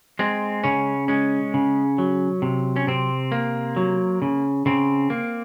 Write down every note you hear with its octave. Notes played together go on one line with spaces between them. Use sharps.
G#3 C4
C#3 C#4
G#3 C#4
C#3
F#3
C3
C#4
C3 C4
A#3
F#3
C#3
C#3 C4
A#3